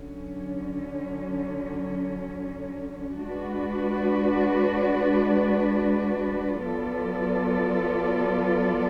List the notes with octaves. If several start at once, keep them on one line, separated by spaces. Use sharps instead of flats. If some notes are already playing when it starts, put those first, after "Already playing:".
Already playing: D3 F#3 C#4
G#3 D4 F#4 B4 D5
F#3 B3 F4 A4 D5